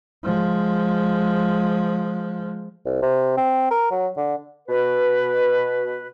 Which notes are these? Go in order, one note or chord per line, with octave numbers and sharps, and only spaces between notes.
F3 G#3
C2
C3
C4
A#4
F#3
D3
B2 B4